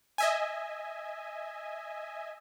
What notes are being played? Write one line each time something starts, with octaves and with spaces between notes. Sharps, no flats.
D#5 E5 G#5